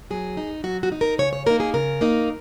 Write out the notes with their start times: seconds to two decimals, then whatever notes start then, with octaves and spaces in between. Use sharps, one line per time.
0.10 F#3 G#4
0.37 D#4
0.64 F#3 F#4
0.83 F#4
0.92 D#4
1.01 A#4
1.18 C#3 C#5
1.33 C#5
1.46 A#3 D#4 A#4
1.60 G#4
1.74 C#3 A#4
2.01 A#3 D#4